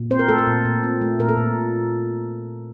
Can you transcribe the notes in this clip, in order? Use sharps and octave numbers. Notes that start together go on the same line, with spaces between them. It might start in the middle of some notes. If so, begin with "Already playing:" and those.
Already playing: A#2
C4 C5
A#4
A3 A4
A#4
A#2
A#2
C4
A3
A#2 A#4
A4
A#2